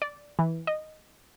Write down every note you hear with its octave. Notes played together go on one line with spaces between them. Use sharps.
D5
E3
D#5